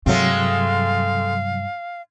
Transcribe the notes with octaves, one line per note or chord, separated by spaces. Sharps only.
G2 C3 F#3 G#3 A3 C4 F5